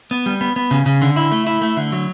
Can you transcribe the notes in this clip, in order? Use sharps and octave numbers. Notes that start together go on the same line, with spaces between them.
B3
G3
B3
B3
C#3
C#3
D3
E4
A3
E4
A3
D3
F#3